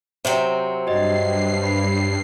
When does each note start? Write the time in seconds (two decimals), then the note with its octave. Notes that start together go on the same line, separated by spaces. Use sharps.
0.25 C3 F#3 C4 C5 C#5
0.87 G2 F#4 D#5 C7
1.63 B5